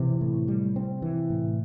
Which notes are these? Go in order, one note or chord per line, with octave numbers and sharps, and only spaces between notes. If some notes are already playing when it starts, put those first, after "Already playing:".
Already playing: C3 E3
A2
G3
C4
E3
A2